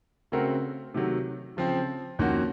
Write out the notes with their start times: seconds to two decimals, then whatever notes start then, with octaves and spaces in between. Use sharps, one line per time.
0.32 C#3 A3 C4 F#4 A#4
0.94 C3 D#3 F#3 A3
1.57 C#3 F3 C4
2.19 F2 D#3 A#3 C#4 F#4